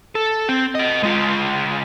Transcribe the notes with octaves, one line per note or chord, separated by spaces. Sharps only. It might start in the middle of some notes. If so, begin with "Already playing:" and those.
A4
C4
B4 D#5
G#3 F4